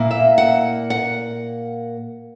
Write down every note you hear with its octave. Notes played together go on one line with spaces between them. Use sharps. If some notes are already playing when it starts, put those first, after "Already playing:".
Already playing: A#2 A#3 E4
E5
F#5
F#5